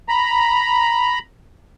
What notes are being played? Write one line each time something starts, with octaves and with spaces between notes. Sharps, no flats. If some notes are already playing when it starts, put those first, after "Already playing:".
A#5 B5